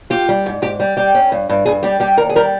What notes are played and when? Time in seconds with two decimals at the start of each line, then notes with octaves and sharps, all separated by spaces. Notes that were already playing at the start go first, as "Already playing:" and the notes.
0.10 F4 G4
0.29 G3
0.46 G#2
0.62 G#2 G4
0.80 G3
0.97 G3 G4
1.15 C#4
1.32 G2
1.49 G2
1.66 G2 G#4
1.83 G3 G4
2.00 G3 G4
2.17 D#2 A#4
2.29 G#4
2.35 G3 A#4